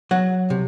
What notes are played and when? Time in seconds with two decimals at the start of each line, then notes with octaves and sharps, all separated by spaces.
0.11 F#3 F#5
0.50 C3